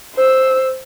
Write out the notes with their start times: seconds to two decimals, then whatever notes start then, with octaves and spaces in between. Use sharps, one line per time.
0.15 C5 E6